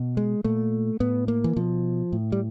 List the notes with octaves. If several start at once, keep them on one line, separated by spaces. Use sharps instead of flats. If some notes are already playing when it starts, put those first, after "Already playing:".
Already playing: B2
G#3
A#2 A3
A2 B3
A#3
E3
B2 F3
A2
G3